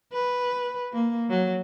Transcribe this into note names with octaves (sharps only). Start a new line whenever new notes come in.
B4
A#3
F#3